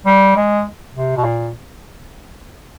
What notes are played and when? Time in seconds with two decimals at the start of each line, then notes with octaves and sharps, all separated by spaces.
0.06 G3
0.36 G#3
0.95 C3
1.17 B2
1.24 A#2